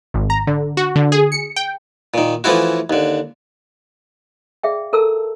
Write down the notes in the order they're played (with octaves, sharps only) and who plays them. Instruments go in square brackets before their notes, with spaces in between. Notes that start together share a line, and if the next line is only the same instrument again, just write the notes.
[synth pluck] G#1
A#5
D3
F#4
D3
G#4
C#7
G5
[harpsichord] A#2 D#3
E3 F3 A3 C#4 E4 F#4
D#2 D3
[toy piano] G#4 D5 E5 F5 G5
A4 A#4 A5 A#5 E6